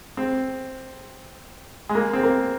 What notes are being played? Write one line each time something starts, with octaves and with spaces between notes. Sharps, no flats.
C4
G#3
A#3
C4
A#3